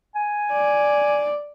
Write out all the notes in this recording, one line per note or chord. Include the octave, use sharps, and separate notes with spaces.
G#5
D5